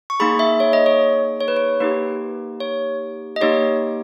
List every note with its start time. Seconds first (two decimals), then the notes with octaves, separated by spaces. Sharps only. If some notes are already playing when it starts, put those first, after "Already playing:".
0.10 C#6
0.20 A#3 D#4 G#4 B5
0.39 E5
0.60 C#5
0.73 D#5
0.86 C#5
1.40 C#5
1.48 B4
1.57 C#5
1.80 A#3 D#4 G4 B4
2.60 C#5
3.36 D#5
3.41 A#3 D#4 G4 C#5